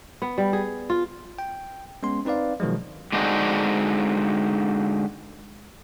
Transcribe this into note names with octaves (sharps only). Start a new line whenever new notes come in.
B3
G3
G#4
F4
G5
G#3 B3 C#4 C6
C4 D#4 B4 D5 F5
B2 D#3 F3 F#3 G#3
D3 G#3 C4 D4 D#4 F#4